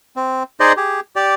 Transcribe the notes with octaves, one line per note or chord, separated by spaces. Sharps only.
C4
D#4 G#4 C5 D5 D#5
G4 G#4
G4 D5